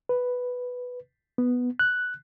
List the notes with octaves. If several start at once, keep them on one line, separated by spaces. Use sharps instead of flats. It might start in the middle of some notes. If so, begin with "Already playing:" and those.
B4
B3
F#6